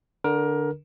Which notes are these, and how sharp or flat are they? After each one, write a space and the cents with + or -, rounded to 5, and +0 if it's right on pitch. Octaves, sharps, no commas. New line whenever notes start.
D3 +0 D4 +0 A#4 +20